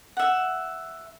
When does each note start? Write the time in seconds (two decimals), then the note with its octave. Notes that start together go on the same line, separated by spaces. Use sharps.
0.17 E5 F#5